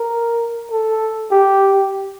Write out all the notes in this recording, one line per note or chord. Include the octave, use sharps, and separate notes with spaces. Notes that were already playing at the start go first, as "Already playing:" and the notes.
Already playing: A#4
A4
G4